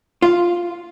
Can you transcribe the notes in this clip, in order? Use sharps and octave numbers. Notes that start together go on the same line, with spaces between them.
F4